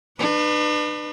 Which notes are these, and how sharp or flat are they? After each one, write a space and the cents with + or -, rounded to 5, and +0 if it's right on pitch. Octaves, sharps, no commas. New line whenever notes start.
D4 +40 B4 +0